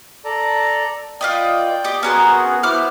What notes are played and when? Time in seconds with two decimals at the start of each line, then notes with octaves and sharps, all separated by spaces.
0.25 A4 D5 A#5
1.21 F4 B4 D5 D#5 G5
1.84 G4 D#5
2.03 B3 C#4 F#4 G#4 A#4 C5
2.63 B3 E4 C5 D6 F6